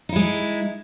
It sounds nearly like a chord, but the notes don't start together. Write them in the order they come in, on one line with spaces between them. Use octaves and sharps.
D#4 E4 G#3